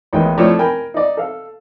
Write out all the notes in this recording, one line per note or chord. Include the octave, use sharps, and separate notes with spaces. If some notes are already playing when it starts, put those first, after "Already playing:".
A1 D#3 G#3 B3 D#4 G5
F3 A3 C4 E4 C#5 D5
A#4 G5 G#5 B5
D#4 D5
A4 F5